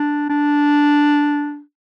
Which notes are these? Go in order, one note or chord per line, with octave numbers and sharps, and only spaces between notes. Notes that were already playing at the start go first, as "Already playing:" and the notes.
Already playing: D4
D4